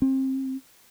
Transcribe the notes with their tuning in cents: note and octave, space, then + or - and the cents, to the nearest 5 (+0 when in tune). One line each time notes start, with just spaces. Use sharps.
C4 +30